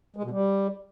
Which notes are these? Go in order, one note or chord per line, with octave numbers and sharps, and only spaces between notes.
G#3
B2
G3